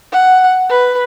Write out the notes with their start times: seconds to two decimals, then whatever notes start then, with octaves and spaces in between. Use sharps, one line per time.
0.12 F#5
0.69 B4